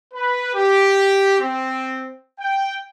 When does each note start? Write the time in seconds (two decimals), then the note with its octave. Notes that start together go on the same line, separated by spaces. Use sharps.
0.14 B4
0.54 G4
1.39 C4
2.40 G5